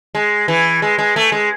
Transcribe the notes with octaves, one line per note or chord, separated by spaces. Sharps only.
G#3
E3
G#3
G#3
A3
G#3